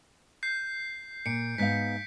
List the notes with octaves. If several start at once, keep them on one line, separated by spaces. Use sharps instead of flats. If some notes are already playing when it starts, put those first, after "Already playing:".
G6 C7
A#2 C#7 D7
G#2 B3 F5 G6 B6